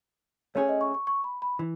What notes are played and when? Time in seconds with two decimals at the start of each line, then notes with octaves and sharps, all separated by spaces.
0.55 A3 C#4 G#4 C#5
0.69 D#5
0.81 C#6
0.94 C#6
1.07 C#6
1.24 B5
1.42 B5
1.59 E3